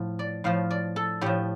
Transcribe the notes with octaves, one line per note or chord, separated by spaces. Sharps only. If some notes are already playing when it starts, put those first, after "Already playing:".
Already playing: A2 F3
D5
A2 F3 F5
D5
A4
A2 F3 G4